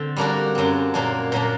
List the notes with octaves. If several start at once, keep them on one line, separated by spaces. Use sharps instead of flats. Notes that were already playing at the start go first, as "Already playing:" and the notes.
Already playing: D3 C4
G3 A#3 D4 F#4
F#2 F#3 C4
A#2 F#3 A#3 D4
A#2 F#3 A#3 D4